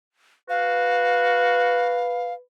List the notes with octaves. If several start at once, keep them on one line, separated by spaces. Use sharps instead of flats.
F#4 B4 F5